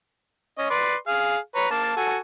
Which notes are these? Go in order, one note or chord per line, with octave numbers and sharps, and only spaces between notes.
C#4 D#5
B4 D5 C6
G#4 F5
B4 C#5 A#5
A#3 A5
F#4 A4 G#5